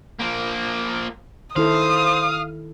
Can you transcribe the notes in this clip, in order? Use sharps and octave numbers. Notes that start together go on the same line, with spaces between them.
F3 A#3
D#3 E4 A4 C5 F5 D#6